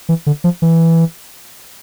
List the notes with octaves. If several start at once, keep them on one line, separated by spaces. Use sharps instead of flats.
E3
D3
F3
E3